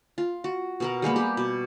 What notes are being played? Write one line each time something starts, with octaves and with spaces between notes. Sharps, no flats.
F4
F#4
B2 A#4 F#5
G3 G#3 A#3 B3
G4
B2